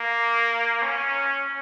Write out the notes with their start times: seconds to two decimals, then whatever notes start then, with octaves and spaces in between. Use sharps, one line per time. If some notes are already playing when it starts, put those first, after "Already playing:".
Already playing: A#3
0.82 C#4